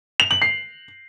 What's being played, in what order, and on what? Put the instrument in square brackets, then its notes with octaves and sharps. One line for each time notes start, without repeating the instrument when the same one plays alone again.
[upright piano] F7
F#7
C7